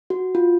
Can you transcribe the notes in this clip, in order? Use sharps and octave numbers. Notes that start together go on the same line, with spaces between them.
F#4
F4